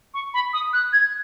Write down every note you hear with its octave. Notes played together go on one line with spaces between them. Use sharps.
C#6
B5
D#6
F#6
G#6